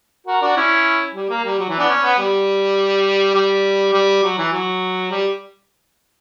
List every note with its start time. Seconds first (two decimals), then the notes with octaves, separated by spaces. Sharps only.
0.27 F#4 A#4
0.42 D4 F#4
0.56 C#4 E4
1.15 G3
1.29 A#3
1.45 G3
1.59 F#3
1.69 E3
1.78 B3 D4
1.89 C#4
2.03 B3
2.19 G3
3.35 G3
3.93 G3
4.23 F#3
4.38 E3
4.52 F#3
5.11 G3